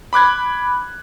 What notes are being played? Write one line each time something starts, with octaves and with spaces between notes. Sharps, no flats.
B5 D6 F#6 G#6